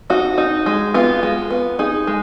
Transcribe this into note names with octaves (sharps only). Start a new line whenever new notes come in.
D#4 F#4
D#4
G#3
B3 F4
G#3
B3
D#4 G#4
G#3